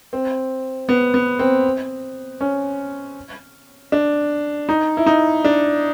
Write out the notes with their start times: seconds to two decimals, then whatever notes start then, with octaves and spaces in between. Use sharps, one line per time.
0.13 C4
0.89 B3
1.14 B3
1.39 C4
2.41 C#4
3.92 D4
4.69 D#4
4.97 E4
5.06 D#4
5.45 D4